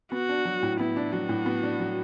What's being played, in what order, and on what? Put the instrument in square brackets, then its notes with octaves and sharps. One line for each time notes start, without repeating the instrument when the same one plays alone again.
[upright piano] B3 [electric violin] F#4
[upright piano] D4
F#3
A2
[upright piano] B3 [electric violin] E4
[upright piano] D4
[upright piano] F#3 [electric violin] F#4
[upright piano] A2
B3
D4
F#3